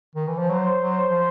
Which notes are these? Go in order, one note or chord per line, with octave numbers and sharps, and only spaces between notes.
D#3
E3
F3
F#3 C5
F#3
F3